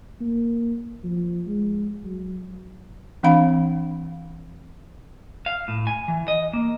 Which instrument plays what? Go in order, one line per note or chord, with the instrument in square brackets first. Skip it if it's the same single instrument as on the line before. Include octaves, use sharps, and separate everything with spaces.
[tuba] A#3
F3
G#3
F#3
[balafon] E3 C4 D4 F5 B5
[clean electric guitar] F5
A2
G#5
E3
D#5
A#3